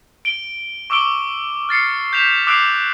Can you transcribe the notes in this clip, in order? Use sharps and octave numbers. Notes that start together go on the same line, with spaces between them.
D7 G7
C#6 D6 E6 D7 G7
F6 A6 C7 C#7
G6 B6 E7 F7
D6 E6 F#6 C7 D7 F7